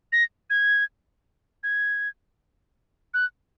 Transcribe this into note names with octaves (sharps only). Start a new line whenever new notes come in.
A#6
G#6
G#6
F#6